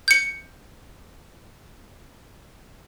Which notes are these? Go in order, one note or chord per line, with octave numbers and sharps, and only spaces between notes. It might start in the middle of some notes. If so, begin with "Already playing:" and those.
G6 C#7